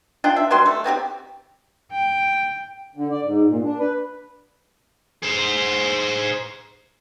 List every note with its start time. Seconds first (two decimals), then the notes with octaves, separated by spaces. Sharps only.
0.24 D4 F4 F#5 G5
0.36 E5
0.51 F#3 G3 D4 C6
0.66 A3
0.84 B3 C4 E4 G4
1.92 G5
2.96 D3
3.11 D5
3.23 G#2
3.47 A#2
3.64 D4
3.79 B4
5.22 G#4 C5